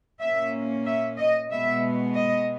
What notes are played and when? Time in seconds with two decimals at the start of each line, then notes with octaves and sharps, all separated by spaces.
0.21 A#2 A#3 C#4 E5
0.86 E5
1.18 D#5
1.50 B2 G#3 B3 E5
2.15 D#5